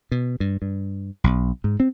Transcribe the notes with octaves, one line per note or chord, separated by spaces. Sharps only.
B2
G2
G2
B1
G#2
C4